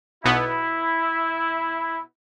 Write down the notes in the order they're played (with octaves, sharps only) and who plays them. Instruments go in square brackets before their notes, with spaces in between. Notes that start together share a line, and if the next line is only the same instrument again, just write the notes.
[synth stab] B1 B2 B3 [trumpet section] E4